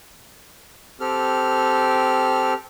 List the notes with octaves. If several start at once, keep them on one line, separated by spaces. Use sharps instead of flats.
C4 G4 A4 F6